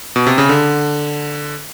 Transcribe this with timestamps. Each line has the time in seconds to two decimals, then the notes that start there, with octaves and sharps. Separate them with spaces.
0.16 B2
0.27 C3
0.38 C#3
0.49 D3